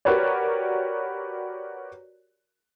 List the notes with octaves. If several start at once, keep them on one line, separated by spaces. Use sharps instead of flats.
F#4 G4 A#4 B4 C#5 D5